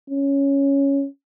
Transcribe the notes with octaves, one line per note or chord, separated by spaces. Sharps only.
C#4